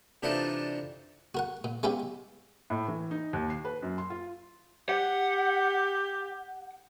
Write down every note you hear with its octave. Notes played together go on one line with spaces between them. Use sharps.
C3 E3 D4 D#4 F4 A4
F#4 A#4 F#5
A#2
G#3 B3 C#4 E4 F4 G4
A2
E3
D#4
D#2
C7
B4
F#2
C6
F4
G4 F#5